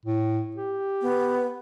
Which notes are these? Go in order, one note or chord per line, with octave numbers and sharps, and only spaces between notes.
A2
G4
B3